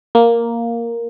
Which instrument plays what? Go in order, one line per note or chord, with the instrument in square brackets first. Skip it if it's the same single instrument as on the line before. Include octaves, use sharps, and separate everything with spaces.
[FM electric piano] A#3